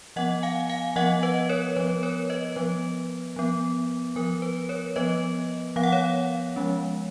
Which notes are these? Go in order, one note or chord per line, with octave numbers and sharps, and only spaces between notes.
F3 B3 D#5 F#5
F5 G#5
F5 G#5
F3 B3 D#5 F#5
B4 D#5
A#4 C#5
F3 B3 B4
A#4 C#5
B4 D#5
F3 B3 B4
F3 B3
F3 B3 A#4
B4
A#4 C#5
F3 B3 B4 D#5
F3 B3 F5
F#5
C#5 F5
F3 G#3 C#4